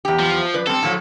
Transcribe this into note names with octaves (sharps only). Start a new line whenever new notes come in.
E2 G4
F3
B4 D5
G3 C4 A4
A2 F3 F#3